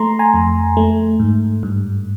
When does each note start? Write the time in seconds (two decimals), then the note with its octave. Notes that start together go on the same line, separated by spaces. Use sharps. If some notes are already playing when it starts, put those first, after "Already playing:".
Already playing: A3 A#5 C6
0.19 G#5 A#5
0.34 F2
0.77 A3
1.20 G#2
1.63 G2